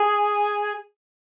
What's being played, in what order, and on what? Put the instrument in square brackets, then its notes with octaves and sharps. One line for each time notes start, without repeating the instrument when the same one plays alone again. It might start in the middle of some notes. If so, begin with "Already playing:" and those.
Already playing: [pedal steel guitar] G#4